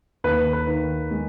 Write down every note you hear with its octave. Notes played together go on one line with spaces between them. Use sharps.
D#2 B4
B4
D#3
G#3